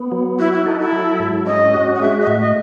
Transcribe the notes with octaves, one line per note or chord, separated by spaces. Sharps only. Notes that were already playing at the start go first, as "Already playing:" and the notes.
Already playing: B3
F#3
E4 F#4
E4
D#4 A4
E4
F#3
G#2
C#4 D#5
F#4
F#5
G#3 E5
D#5
A2 E5
D#5